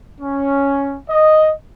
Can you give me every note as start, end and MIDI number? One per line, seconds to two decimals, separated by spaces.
0.21 0.97 61
1.10 1.52 75